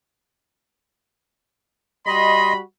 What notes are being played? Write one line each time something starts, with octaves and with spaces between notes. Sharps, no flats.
G3 F#4 D#5 B5 C6